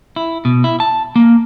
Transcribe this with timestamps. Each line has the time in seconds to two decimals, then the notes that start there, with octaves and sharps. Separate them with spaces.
0.16 E4
0.45 B2
0.64 E4
0.80 A5
1.16 A#3